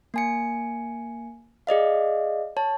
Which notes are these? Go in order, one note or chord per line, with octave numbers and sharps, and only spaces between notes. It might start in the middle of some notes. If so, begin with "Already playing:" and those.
A#3 G#5 C#7
G#4 D5 D#5 F5
C#5 A5